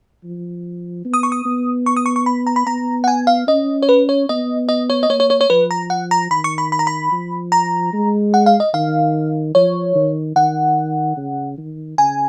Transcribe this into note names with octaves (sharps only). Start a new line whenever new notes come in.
F3
B3
D#6
C#6
D#6
B3
C#6
D#6
C#6
C#6
B5
A#5
B5
B3 A#5
F#5
G#5
F5
C#4 D#5
C#5
B4
C#5
B3 D#5
D#5
C#5
D#5
A#3 C#5
C#5
C#5
C#5
F3 B4
A#5
F#5
A#5
D#3 B5
C#6
B5
B5
A#5
B5
F3
A#5
G#3
F#5
F5
D#5
D#3 F5
F3 C#5
D#3
D#3 F#5
C#3
D#3
C#3 G#5